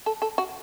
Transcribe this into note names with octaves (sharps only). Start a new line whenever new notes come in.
A4
A4
F#4